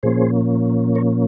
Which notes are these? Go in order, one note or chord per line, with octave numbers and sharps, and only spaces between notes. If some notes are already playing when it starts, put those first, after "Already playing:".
A#2 F3 A#3 C#4 G#4 C5
A#4 C#5